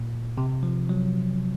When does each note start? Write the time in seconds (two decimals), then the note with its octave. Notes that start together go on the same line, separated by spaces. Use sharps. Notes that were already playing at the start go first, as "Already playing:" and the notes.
Already playing: A#2
0.38 C3
0.63 F3
0.89 F#3